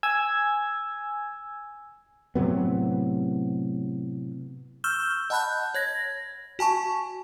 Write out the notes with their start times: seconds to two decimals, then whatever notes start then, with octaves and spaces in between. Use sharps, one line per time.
0.03 G#5 E6 G#6
2.35 A2 C3 F#3 B3
4.84 C#6 E6 F6 G6 E7 G7
5.30 D#5 F#5 A5 B5 F#6 G6
5.75 C#5 G#6 A#6
6.59 F#4 G#5 A5 C#6